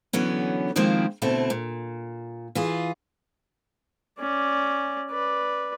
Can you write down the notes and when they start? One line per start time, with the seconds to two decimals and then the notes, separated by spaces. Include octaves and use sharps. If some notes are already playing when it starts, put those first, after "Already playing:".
0.13 D3 E3 F#3 B3 C#4
0.76 D#3 F3 G#3 A#3 C4 E4
1.22 D2 B2 A3 C4 E4
1.50 A#2
2.55 E3 F4 G#4
4.19 C#4 D5
5.11 B4 D5